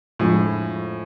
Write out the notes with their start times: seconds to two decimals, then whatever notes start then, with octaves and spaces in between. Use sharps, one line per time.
0.19 F2 A2 D3 G#3